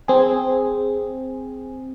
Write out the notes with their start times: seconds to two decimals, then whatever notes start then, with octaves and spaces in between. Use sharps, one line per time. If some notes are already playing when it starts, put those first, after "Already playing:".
0.08 C4 G#4